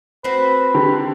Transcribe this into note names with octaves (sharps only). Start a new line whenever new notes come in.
C4 F#4 B4 C5
D3 D#3 G4